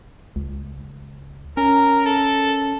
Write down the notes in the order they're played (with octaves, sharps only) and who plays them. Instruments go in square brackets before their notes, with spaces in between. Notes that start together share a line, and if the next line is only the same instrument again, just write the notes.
[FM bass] C#2
[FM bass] C#4 [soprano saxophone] A#4
[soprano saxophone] A4